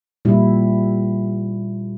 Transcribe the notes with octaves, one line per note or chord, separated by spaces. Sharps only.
A#2 G3 E4